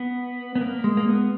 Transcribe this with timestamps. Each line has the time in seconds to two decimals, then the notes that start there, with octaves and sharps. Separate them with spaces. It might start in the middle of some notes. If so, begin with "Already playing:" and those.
Already playing: B3
0.55 B3
0.61 A#3
0.84 G#3
0.97 A#3
1.08 B3